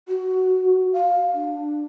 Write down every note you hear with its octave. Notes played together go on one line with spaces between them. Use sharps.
F#4
F5
D4